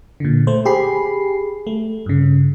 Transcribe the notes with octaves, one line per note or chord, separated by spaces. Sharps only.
A#2 D3
A3 C5
G4 G#4 B5 C7
A3
G2 C#3